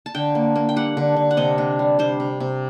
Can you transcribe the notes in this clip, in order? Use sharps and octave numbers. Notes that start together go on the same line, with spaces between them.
A5
D3 G5
A#3
A#3
G5
G3 F#5
D3
D3
F#5
C3 D#5
D4
G3
G3 C5
C3
C3